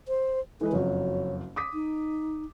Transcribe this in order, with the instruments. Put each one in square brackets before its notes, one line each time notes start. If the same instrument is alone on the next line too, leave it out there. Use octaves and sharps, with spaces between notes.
[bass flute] C5
[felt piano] E3 G#3 B4 [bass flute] A4
[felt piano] F#1 F2 F#3 [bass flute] C#5
[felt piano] D6 D#6 B6
[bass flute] D#4